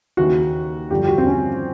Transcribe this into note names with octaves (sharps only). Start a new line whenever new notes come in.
D#2 C#3 E3 F#4
G2 D3 F3 G4
G4
F#4
C4
C#4